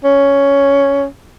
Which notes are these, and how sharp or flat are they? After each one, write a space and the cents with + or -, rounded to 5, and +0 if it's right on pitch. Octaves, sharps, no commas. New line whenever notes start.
C#4 +10